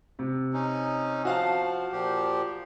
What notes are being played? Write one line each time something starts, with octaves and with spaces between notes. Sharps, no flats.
C3
C#4 D#4
F3 F#4 F5 A5
A#2 F3 G4